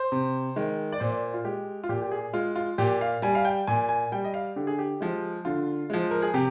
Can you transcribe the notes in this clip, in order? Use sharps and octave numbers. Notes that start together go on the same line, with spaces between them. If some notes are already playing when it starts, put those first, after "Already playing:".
Already playing: C5
C3
D#3 G#3
D5
A#2 C5
F4
G#3 G4
F4
A#2 G4
G4
G#4
G#3 F4
F4
A#2 G4
F5
G3 G#5
F5
G5
A#2 G#5
G#5
G3 G5
D#5
F5
D3 G4
G#4
G4
F3 G#3
D3 F4
F3 G#3
A#4
G#4
C3 G4